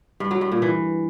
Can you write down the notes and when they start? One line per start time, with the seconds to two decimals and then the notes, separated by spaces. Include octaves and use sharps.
0.20 G2
0.31 F#3
0.41 G2
0.52 A#2
0.62 E3